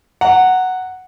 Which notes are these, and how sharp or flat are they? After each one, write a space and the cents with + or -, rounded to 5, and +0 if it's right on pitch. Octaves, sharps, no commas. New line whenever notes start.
F#5 +0 A#5 -20